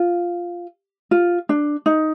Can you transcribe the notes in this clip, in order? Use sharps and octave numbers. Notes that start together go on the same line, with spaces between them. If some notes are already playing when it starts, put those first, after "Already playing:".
Already playing: F4
F4
D4
D#4